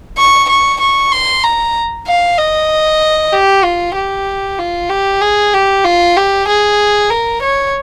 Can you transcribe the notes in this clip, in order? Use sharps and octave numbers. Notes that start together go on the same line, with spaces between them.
C#6
C#6
C#6
C6
A#5
F5
D#5
G4
F4
G4
F4
G4
G#4
G4
F4
G4
G#4
A#4
C#5